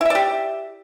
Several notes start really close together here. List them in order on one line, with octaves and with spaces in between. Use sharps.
E4 E5 D5 G4